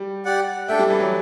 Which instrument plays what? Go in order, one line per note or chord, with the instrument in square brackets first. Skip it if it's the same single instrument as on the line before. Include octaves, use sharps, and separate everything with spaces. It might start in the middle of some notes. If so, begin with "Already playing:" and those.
Already playing: [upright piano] G3
[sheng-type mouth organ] G4 D5 F#5
[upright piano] A3 [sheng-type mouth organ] D4 A4 E5 G5
[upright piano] G3
E3
F#3